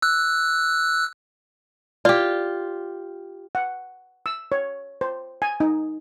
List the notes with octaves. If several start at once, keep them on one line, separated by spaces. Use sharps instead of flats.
E6 F#6
F4 G4 D5
F#5
E6
C#5
C5
G#5
D#4